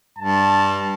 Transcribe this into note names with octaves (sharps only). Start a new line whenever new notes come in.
G2 A5